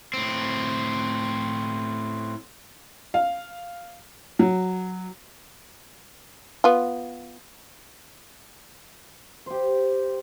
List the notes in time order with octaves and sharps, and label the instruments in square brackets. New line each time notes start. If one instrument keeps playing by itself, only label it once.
[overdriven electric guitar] A2 C4
[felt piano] F5
F#3
[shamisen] B3 F4
[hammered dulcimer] G4 C5